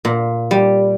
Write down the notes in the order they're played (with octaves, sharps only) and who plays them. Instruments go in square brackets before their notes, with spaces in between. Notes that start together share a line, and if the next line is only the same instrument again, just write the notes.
[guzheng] A#2
G3